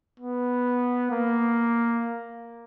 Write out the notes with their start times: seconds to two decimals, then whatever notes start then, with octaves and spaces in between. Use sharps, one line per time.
0.20 B3
1.12 A#3